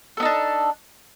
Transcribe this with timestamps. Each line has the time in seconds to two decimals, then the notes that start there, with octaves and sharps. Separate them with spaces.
0.17 A4
0.20 B3
0.22 D#4
0.25 D4